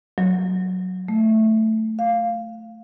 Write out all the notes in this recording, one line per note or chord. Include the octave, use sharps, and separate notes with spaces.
F#3
A3
F5